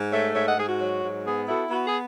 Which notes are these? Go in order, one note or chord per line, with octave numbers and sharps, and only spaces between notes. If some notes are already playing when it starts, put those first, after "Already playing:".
Already playing: G#2
A3 C#5 E5
G#2 C#5 E5
D#5 F#5
G#2 G#4
F#4
F#3
G#2
B3 G#4
E4 F#4 A4
B3 F#4
G#4